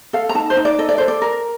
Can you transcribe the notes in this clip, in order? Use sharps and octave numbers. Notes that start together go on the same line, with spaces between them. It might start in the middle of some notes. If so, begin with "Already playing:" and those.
A4 F5
A#5
D#4 A5
C5
D#4
D5
A4 D#5
D5
A4 C5
D5
A#4